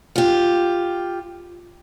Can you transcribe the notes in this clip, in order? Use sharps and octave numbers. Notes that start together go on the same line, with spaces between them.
F4 G4